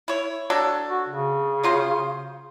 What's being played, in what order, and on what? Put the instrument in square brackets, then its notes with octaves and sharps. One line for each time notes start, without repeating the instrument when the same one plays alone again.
[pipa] E4 C#5
F#3 D4 A4
[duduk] F#4
C#3
[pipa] F#3 F4 C5